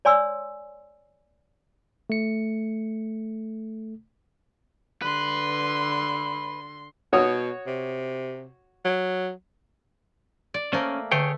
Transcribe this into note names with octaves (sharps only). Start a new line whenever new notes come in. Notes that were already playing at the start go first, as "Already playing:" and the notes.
C#5 D5 G#5 C6 E6
A3 C#7
D3 B4 C6
B2 F#4 C#5 D#6
C3
F#3
D5
A3 A#3 C#4 C5
D3 A3 G#4 C#5 G5